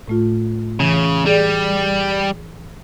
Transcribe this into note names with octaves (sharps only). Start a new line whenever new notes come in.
A2 A3 F4
C#3 E3
G3 G#4 D5